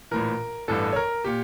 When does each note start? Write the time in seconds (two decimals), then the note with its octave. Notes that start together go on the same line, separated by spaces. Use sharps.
0.11 A#1 A2 E3 A#4
0.68 A1 G2 E3 A4
0.93 C#5
0.96 A#4
1.24 A#2 G4